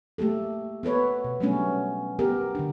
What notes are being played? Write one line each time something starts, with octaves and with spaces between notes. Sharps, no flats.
A3 A#3 G4 A4
B3 A4 B4 C#5
B2
F#3 G3 A3 B3 C#4 D4
B3 G4 A#4
D3 D4